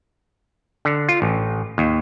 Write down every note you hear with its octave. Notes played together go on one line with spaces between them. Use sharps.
D3
F4
A1
D#2